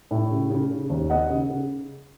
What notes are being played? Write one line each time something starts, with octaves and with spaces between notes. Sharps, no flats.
A2
C#3
C#3
C#3
D#2
B3 D#5 F#5
C#3
C#3